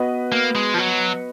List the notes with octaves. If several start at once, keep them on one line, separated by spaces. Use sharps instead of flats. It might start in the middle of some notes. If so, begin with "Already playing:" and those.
Already playing: B3 F#4 B4 D#5
A#3
G#3
F3
F#3